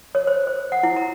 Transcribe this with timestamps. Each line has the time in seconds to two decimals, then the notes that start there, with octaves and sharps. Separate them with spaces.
0.15 C#5
0.27 C5
0.47 C5
0.72 F#5
0.83 E4
0.96 A#5